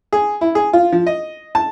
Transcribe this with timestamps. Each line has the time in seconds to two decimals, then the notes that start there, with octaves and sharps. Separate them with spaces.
0.13 G#4
0.41 E4
0.55 G#4
0.73 F4
0.92 F3
1.07 D#5
1.55 A5